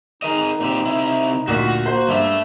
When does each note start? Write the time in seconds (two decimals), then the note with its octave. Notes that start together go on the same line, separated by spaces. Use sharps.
0.22 D#4 G#4 A#4 D#5
0.60 A#2 C4 G4
0.85 C3 E4
1.47 D2 A#2 F#4 B6
1.86 A#3 C5
2.08 G2 A3 E5